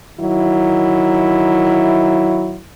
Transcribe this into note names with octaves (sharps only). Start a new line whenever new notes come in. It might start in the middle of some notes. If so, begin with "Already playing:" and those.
D#3 F#3 E4